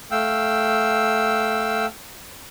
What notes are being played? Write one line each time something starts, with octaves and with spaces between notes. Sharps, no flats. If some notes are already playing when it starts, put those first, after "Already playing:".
A3 F5 G5 E6